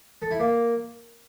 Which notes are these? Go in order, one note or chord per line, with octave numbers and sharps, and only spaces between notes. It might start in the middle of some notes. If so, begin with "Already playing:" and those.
A4
E4
A#3